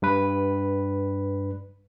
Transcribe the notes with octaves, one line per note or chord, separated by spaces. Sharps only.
G2 B4